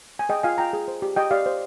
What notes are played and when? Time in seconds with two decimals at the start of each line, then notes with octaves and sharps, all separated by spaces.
0.19 G#5
0.29 G#4 D#5 G5
0.43 F4 F5 G#5
0.58 F4 G5 A#5
0.73 G#4
0.88 C5
1.02 G4
1.16 G4 D#5 G5
1.31 G4 D5 F5
1.46 C5